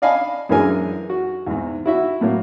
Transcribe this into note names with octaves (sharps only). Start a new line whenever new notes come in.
D5 D#5 F5 G#5 A5 B5
F#2 E3 G#3 D4 A#4 G#5
F#4
E2 G#2
E4 F#4 E5
A2 F#3 A#3